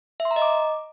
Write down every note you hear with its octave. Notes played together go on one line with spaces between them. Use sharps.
E5
C6
A#5
D#5
D6